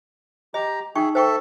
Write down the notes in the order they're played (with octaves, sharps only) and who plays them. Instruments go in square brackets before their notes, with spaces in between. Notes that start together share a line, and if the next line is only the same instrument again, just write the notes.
[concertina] G4 A#5 [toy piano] D#5
[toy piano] D#4 G5 C#6 [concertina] G#4 E5
[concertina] A4 E5 [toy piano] C5 G5 C#6